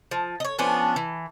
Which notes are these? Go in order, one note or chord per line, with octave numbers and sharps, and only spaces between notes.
F3
C#5 D#5
F3 B3 C#4 D4
E3